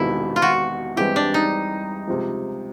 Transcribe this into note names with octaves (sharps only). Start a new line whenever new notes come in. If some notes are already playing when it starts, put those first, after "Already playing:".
Already playing: E1 E2 C3 D#3 E4
F4
F#4
G2 E3 G#3 C4 E4 G4
D4
D#4
C#2 C3 F3